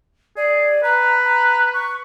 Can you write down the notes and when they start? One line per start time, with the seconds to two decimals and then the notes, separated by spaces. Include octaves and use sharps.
0.37 G#4 D5
0.84 B4 A#5
1.24 A#5
1.73 C#6